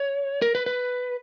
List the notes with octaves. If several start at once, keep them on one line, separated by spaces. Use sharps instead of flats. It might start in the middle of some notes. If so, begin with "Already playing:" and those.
Already playing: C#5
A#4
B4
B4